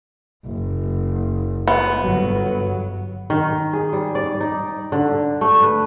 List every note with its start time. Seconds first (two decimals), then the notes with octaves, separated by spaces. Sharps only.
0.46 F#1
1.68 B3
2.00 G1 F#3
3.30 D#3
3.73 G#4
3.93 G3
4.15 D5
4.41 D#4
4.92 D3
5.41 A3
5.63 B4